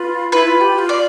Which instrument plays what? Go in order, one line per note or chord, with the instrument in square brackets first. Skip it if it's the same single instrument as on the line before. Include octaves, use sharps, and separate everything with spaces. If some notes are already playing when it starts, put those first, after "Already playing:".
Already playing: [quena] F4 [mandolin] B4
[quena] E4 [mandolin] B4
[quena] F4
G4
G4
F4
[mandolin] D5